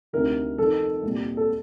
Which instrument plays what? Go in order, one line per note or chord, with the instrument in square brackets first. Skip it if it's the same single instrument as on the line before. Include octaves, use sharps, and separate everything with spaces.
[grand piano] D2 C3 D#3 A#4
F2 C3 D#3 A4
C2 A#2 G3
A4